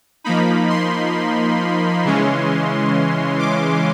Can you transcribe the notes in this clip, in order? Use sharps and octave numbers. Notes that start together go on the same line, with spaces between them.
F3 A#3 D#4 B5
C6
C#3 E3 G#3 C#4
D6